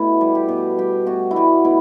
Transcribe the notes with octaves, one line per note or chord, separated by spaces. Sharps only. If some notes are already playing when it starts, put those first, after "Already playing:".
Already playing: B2 A3 E4
G3
G4
B2
G3 G4
B2 F#4
E4
G3 F#4
B2 E4